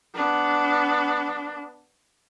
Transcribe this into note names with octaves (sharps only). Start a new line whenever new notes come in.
B3 D4